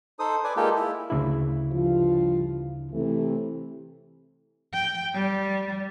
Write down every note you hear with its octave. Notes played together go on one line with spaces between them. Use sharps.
D#4 A4 C5 D#6
B4 D5 G#5
G#3 A#3 D#4 F4 G4 A4
E4
D2 C#3 E4
G2 F3 F4
C3 E3 A3
G5
G3